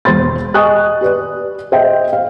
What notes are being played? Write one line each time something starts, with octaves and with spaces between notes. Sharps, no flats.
E1 C5 C6 A6
D#5 G#5 C#6 D#6 F#6
G4 B4 D5
C5 D#5 E5 G5
F5